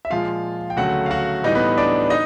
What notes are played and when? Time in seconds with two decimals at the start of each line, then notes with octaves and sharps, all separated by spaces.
0.05 E5
0.10 A#2 F3 G#3 F4 F5
0.70 G5
0.77 D2 C#3 F#3 A3 F#4 F#5
1.06 F5
1.11 F#4 F#5
1.44 A2 E3 G3 D#4 D#5
1.55 B3 B4
1.78 D4 D5
2.10 D#4 D#5